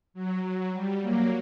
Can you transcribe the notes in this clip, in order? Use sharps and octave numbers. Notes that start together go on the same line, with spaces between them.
F#3
F#3
G3
F#3 A#3